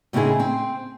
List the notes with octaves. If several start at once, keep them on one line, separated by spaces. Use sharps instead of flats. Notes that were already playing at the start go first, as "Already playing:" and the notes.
A2 C#3 C4 D#4 E4 G#4
C4